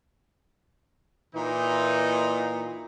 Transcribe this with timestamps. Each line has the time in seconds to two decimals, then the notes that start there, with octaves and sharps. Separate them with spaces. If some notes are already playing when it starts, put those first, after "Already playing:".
1.35 A#2 E3 D#4